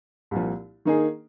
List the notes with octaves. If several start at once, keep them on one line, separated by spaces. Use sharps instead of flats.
C2 A#2 F3
D#3 A#3 D#4 G#4